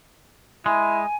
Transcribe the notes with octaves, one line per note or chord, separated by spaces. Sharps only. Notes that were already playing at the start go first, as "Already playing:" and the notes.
G#3 E4 G#5